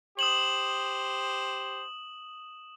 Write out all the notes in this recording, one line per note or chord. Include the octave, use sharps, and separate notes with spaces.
G4 C5 D#6 E7 F#7